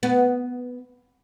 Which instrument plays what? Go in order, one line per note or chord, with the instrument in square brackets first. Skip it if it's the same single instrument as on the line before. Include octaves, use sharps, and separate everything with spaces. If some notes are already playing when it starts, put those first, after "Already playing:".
[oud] B3